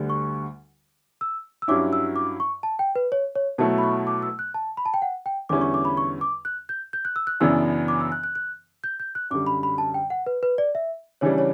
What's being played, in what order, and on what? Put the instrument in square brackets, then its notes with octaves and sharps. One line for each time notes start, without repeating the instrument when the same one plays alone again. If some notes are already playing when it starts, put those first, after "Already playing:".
Already playing: [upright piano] D2 D3 G3
[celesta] C#6
E6
E6
[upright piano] G2 F#3 C#4 E4 [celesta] D6
[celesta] E6
D6
C#6
A5
G5
B4
C#5
C#5
[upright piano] B2 F#3 A3 E4 [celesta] A5
[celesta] B5
C#6
D6
E6
F#6
A5
B5
A5
G5
F#5
G5
[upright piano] E2 D3 G3 C#4 E4 [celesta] D6
[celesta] C#6
D6
B5
C#6
D6
F#6
G6
G6
F#6
E6
F#6
[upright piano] F#2 C#3 E3 B3 D4 [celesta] E6
[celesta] D6
E6
F#6
F#6
F#6
G6
G6
F#6
[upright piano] F#2 [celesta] D6
[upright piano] D3 G3
[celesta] B5
B5
A5
G5
F#5
B4
B4
D5
E5
[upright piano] C#3 E3 G3 D4 [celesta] C#5
[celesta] C#5